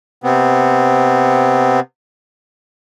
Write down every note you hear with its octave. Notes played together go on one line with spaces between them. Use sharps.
C3 B3 C4